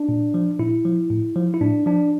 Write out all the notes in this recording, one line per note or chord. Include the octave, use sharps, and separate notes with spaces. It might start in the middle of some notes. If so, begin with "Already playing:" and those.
Already playing: D4
A#2
F3
A#2 E4
F3
A2
F3
E4
A2 D4
F3 D4